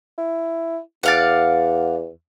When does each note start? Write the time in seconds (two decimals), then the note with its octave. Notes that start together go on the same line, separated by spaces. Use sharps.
0.18 E4
1.03 E2 D5 F5 F#5